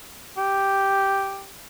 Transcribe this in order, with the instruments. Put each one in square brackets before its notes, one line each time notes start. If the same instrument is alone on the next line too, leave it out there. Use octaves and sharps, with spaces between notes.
[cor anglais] G4